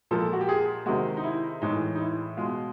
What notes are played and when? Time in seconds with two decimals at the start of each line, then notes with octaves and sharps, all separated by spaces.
0.11 A#2 F3 G#3 A4
0.33 F#4
0.41 G4
0.49 G#4
0.86 C3 D#3 G#3 F#4
1.17 D#4
1.24 E4
1.62 A2 E3 G#3 D#4
1.95 D#4
2.00 E4
2.37 B2 G#3 F4